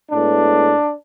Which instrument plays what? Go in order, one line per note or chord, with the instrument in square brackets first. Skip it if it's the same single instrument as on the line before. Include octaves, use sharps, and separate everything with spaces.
[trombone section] A2 G#3 B3 D4